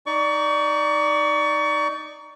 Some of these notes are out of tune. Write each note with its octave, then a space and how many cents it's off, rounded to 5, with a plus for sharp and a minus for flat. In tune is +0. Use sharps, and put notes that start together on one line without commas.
D#4 +0 D5 +0 C#6 +30